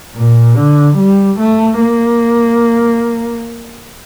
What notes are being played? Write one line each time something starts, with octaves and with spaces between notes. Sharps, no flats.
A#2
D3
G3
A3
A#3